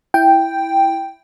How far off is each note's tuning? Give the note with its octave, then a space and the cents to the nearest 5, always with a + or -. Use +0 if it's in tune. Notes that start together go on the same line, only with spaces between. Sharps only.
E4 +0 G5 +0